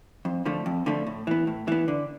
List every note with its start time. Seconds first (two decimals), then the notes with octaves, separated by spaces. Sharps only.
0.25 F2
0.45 D3 F3 A3
0.66 F2
0.86 D3 F3 A3
1.07 A2
1.27 E3 B3
1.47 A2
1.68 E3 B3
1.88 D3